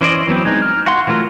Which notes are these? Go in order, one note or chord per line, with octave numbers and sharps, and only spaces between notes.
E3 C#4 C5 D5 D#5
E3 F#3 B3 C4
G#3 D#4
F6
F#4 F5 F#5 C6
E3 F#3 A3 F4 A#4